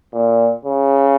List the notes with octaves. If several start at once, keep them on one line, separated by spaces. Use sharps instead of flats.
A#2
C#3